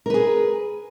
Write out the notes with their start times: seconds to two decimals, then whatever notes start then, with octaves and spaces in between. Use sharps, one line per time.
0.06 A#4
0.10 B4
0.14 G#4